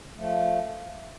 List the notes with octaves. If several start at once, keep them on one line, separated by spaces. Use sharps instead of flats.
C#3
F3 A3